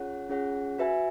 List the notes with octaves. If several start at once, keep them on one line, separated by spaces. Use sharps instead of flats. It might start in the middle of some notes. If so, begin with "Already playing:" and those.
Already playing: C#4 F4 G#4 C#5 F#5
C#4 F4 G#4 C#5 F#5
F#4 B4 E5 G#5